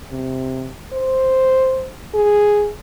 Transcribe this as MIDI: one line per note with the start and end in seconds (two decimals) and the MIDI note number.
0.11 0.69 48
0.93 1.90 72
2.15 2.70 68